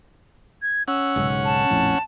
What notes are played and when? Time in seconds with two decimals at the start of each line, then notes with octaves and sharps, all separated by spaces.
0.62 G#6
0.88 C#4 F#5 E6
1.16 B1 G#2 C#3
1.45 A5
1.70 A#1 F2 A2